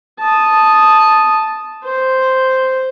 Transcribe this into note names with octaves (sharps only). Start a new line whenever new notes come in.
A5 D#6
C5